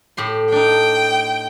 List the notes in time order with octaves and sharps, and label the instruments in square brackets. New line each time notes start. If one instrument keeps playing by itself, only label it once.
[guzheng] A2 G4 C6
[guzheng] D4 D#4 [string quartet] G5